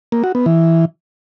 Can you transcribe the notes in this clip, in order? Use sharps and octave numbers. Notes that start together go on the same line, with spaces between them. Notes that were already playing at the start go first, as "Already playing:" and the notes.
A#3
F#4
B3
E3